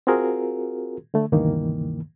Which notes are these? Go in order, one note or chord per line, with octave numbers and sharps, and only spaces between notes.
C4 F4 F#4 G#4 A#4
D3 A3
D2 G2 C3 D#3 E3 A#3